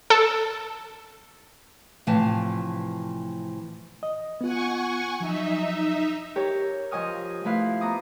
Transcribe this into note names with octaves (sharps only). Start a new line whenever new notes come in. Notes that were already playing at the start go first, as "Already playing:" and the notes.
A4
A2 C3 E3 F3 G#5 A5
D#5
B3 F4 F#5 G#5 C#6
F3 F#3 D#4 E5
G4 A#4 C#5
F3 D#5 G#5 C#6 D#6 F6
F3 A3 E4 B4 F5
B3 A#5 D6 D#6